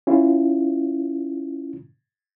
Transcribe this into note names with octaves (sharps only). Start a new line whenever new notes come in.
C#4 E4 F4